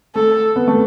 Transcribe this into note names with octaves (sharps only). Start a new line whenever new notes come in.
A3 A4
B3
A3